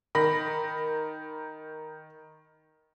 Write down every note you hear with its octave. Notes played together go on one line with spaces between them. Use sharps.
D#3 B5 A#6